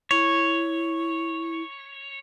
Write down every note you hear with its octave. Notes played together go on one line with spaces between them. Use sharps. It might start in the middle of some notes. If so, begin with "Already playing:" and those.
E4 C#5